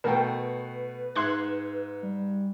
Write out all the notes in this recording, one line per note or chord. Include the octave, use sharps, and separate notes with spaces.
B2 A3 A#4 B4 F#5 G5
G#2 E5 C6 F#6 G#6
G3